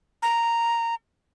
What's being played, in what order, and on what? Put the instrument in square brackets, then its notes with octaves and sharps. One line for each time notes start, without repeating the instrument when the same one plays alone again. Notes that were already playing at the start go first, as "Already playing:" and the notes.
[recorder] A#5